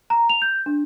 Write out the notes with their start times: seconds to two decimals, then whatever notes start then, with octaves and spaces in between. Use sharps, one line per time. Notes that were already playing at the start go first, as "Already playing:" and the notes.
0.10 A#5
0.29 F7
0.42 G6
0.66 D4